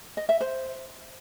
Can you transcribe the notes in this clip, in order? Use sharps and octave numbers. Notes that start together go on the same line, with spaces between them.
D#5
E5
C5